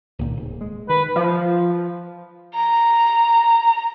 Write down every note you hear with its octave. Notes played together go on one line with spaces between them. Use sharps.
C#2 A#2 D#3
D1
G#3
D#3 B4
F3
A#5